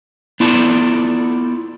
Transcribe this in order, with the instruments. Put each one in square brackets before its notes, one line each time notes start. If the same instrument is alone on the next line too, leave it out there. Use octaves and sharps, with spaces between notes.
[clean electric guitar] B3 E4 F4 A4 D5 A5